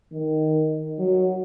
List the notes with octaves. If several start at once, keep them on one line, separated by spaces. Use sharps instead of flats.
D#3
F#3